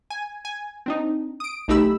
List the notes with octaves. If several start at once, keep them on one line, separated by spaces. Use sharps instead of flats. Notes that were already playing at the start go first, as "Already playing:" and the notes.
G#5
G#5
C4 D4 D#4
D#6 D7
B1 A3 D#4 G4 B5 E6